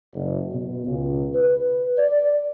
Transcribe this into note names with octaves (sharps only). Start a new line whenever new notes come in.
F#1
B2
C#2
B4
D5